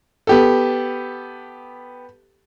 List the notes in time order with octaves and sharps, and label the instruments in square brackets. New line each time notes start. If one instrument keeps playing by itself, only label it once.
[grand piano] B3 G4 A4